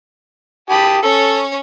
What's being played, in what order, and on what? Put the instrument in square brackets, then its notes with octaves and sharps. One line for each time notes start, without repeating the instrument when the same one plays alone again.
[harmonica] G4 A5 D#6 [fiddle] B5
[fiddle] C#4 C#5 [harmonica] A4